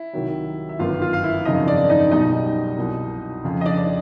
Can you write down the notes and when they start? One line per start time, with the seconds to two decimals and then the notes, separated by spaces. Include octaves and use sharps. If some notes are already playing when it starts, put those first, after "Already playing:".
Already playing: E4
0.13 C2 C3 D#3 F#3
0.69 E5
0.79 G1 F#2 D#3 F4 F5
1.02 F4 F5
1.13 F5
1.24 E4 E5
1.45 G#1 F#2 C#3 F3 D#4 D#5
1.67 D4 D5
1.90 D#4 D#5
2.11 B1 B2 G3 D#4 D#5
2.78 C2 B2 F#3
3.44 F2 C#3 F3
3.61 D#5
3.66 D4 D5
3.77 D5